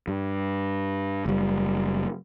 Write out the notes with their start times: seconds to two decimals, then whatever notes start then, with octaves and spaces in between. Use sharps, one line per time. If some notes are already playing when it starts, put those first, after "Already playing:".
0.08 G2
1.26 F#1 G3